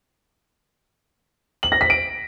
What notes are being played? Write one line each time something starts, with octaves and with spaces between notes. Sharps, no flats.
F#7
A#6
B6
D7